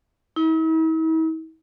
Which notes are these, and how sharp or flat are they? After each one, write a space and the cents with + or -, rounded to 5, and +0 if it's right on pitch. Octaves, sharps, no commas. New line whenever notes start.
E4 -45